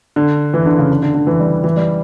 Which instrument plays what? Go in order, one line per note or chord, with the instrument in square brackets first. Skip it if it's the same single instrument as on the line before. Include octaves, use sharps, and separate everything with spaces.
[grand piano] D3
E3
D3
C#3
D3
D3
D3
E3
G3
E3
G3